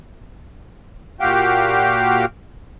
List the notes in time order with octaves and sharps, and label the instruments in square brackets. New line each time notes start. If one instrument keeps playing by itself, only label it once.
[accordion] A#2 F#4 G4 F5 G5